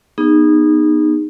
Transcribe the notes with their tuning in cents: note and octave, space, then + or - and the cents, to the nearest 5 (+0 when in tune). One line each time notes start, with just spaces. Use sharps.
B3 -25 D#4 -20 G#4 -25